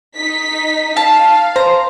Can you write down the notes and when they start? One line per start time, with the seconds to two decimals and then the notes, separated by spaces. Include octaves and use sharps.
0.16 D#4 B6
0.97 F5 A5
1.56 C5 A#5 C6